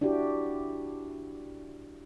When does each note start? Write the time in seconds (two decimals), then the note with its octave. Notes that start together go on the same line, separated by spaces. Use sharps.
0.01 D4 E4 F#4 G4